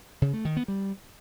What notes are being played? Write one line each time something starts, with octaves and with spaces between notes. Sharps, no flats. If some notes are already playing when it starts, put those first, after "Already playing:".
C#3
A3
D#3
B3
G3